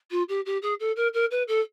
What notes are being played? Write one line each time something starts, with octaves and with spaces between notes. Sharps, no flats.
F4
G4
G4
G#4
A4
A#4
A#4
B4
A4